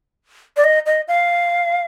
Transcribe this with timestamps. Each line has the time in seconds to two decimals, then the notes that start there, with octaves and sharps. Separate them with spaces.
0.57 D5
0.64 D#5
0.86 D#5
1.08 F5